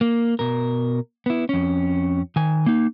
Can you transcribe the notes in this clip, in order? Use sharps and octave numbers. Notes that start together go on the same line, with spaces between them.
A#3
B2 A#4
B3 E4
F2 C#4
D#3 G#5
A#3 D#4